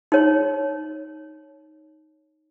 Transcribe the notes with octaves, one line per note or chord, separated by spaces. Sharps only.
D#4 C#5